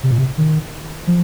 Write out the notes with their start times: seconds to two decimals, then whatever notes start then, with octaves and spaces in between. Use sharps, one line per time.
0.03 C3
0.11 A#2
0.18 C3
0.38 D#3
1.07 F3